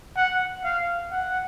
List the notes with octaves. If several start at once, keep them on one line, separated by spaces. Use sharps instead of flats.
F#5
F5
F#5